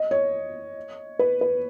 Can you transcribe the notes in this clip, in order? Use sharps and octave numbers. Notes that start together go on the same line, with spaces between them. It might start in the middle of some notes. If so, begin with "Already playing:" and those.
Already playing: D#5
C#5
B4
B4